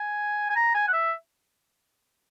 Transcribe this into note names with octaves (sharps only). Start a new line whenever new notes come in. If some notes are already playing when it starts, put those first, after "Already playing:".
Already playing: G#5
G#5
A#5
G#5
F#5
E5